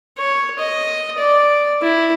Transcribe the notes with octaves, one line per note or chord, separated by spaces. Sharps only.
C#5
D#5
D5
E4